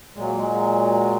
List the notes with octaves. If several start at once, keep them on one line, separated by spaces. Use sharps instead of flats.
A#2 F#3 G#3
A#3
G#3